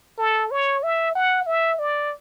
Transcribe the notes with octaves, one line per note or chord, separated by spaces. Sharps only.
A4
C#5
E5
F#5
E5
D5